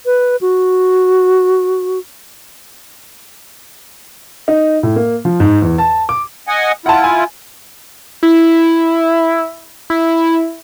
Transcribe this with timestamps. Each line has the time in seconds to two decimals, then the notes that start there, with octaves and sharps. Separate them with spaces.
0.06 B4
0.41 F#4
4.48 D#4
4.83 A2
4.96 A#3
5.25 F3
5.40 G#2
5.62 E2
5.78 A5
6.09 D6
6.48 D#5 F#5 G#5
6.86 E4 F4 F#5 A5
7.04 G#5
8.23 E4
9.90 E4